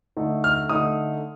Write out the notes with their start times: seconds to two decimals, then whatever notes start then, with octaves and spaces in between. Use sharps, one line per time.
0.17 D3 A3 D#4
0.44 F6
0.69 D3 A3 D#4 D#6